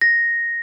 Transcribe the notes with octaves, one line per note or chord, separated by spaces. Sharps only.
A#6